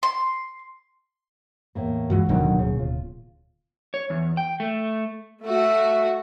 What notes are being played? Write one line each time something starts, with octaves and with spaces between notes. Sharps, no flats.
C6
E2 A2 A#3
G2 E3 G#3 F4 F#4
D1 D#2 B2 D3 D#3 F#3
C#3
F4
C#5
E2
G5
A3
A3 F#4 E5